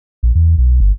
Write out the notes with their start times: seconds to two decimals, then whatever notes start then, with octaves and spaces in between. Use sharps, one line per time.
0.23 A#1
0.35 E2
0.58 B1
0.80 G1